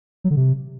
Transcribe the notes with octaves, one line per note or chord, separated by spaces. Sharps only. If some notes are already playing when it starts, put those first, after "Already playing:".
F#3
D3
C3